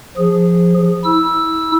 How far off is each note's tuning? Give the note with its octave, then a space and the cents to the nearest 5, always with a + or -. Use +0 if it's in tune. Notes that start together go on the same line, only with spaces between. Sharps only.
F3 +0 G#4 -15
E4 -35 E6 +0